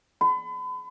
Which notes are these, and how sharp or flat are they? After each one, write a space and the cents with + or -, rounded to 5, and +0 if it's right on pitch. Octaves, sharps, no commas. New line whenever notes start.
B5 +40